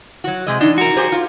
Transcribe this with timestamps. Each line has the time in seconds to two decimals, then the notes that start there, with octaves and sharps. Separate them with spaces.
0.24 F#3 F#4
0.47 C3 G#3 D#5
0.61 E3 D4 D#4
0.78 F#4 A#4
0.97 G4 G#4 C5
1.12 F4